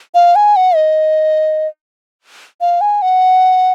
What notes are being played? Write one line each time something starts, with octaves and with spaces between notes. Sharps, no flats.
F5
G#5
F#5
D#5
F5
G#5
F#5